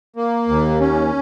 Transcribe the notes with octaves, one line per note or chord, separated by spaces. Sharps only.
A#3
D#2
C#4